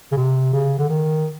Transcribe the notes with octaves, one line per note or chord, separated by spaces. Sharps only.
C#3
C3
C#3
D3
D#3